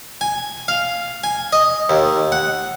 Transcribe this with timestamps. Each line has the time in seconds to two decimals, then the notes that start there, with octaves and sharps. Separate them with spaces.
0.21 G#5
0.68 F5
1.24 G#5
1.53 D#5
1.90 D#2
2.32 F#5